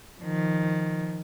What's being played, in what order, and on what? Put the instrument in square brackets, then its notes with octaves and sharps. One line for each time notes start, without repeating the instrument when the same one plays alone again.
[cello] D#3 F3